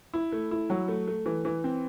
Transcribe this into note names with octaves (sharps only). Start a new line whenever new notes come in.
E4
A3
E4
F#3
A3
A3
E3
E3
C4